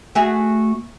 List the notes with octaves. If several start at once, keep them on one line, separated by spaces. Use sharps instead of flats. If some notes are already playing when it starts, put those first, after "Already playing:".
A3 F#4 G#4